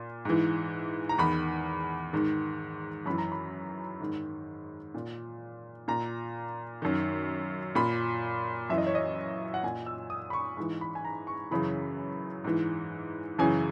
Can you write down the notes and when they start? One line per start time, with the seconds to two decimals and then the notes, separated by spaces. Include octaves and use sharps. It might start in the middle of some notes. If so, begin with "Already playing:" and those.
Already playing: A#2
0.25 G#2 E3
1.09 A#5
1.18 E2 D#3 B5
2.13 G#2 D#3
3.06 F#2 E3 B5
3.18 A#5
3.32 B5
4.01 G#2 D#3
4.94 A#2
5.88 A#2 A#5
6.82 F#2 D#3
7.75 A#2 B5
8.70 F#2 E3 E5
8.78 D#5
8.87 C#5
8.95 D#5
9.54 F#5
9.63 A#2 G#5
9.86 E6
10.10 D#6
10.30 B5
10.33 C#6
10.57 G#2 C#6
10.60 E3
10.81 B5
10.95 G#5
11.05 A#5
11.27 C#6
11.51 F#2 C#3 E3 B5
12.44 G#2 E3
13.39 F#2 C#3 E3 G#5